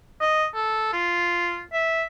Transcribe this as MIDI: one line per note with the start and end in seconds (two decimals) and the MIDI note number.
0.21 0.46 75
0.55 0.89 69
0.93 1.60 65
1.73 2.04 76